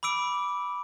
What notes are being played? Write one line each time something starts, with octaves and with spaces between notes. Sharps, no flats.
B5 D6 E6 D7